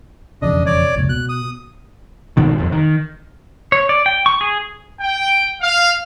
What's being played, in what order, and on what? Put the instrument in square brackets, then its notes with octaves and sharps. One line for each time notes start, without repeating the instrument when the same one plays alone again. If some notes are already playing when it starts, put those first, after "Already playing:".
[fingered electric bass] E1 F2 C#3 [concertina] D4 D#5
[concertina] C#5 D5
[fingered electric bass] F1 C#2 A#2
[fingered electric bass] B2 [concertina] F#6
[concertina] D#6
[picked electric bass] B1 G#2 B2 D#3
E1 F2
D#3
[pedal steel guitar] C#5
D5
G5
C#6
G#4
[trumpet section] G5
F5